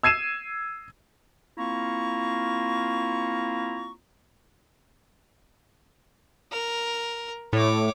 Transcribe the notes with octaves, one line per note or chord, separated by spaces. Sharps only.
E6 G#6 C7 D#7 E7
A#3 C4 E4 F4 A#5 C#6
A#4
A2 C#5 D6